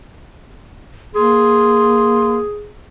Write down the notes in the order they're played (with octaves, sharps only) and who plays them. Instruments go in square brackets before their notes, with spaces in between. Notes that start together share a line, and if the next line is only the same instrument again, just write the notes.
[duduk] A#3 [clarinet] G#4 [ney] C6